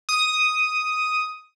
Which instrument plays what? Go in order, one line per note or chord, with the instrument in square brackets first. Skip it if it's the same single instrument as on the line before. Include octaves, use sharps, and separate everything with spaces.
[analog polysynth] D#6